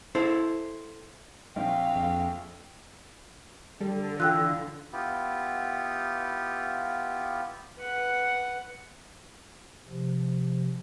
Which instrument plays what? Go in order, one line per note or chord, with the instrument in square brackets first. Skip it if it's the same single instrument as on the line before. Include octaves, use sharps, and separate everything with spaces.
[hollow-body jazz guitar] E4 A4 C5
[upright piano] A#1 C4 [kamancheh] F5 [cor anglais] G5
[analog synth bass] F2
[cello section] D3 [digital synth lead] G3 [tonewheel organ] A4
[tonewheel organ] E3 [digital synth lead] F4 [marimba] G5 E6 F#6
[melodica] B3 E4 F4 G4
[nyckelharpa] B4 F#5
[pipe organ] C3 F3